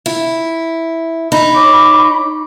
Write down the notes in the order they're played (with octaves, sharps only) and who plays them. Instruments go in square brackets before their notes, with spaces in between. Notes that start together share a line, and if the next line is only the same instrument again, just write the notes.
[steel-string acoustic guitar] E4
[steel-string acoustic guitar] D#4 [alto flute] B5
[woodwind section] C#5 D6